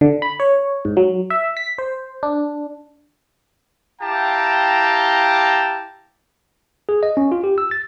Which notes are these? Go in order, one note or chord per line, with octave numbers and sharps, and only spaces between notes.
D3
B5
C#5
G#2
F#3
E5
B6
C5
D4
E4 G4 F5 G5 A5 A#5
G#4
D#5
C#4
F4
G4
E6
A6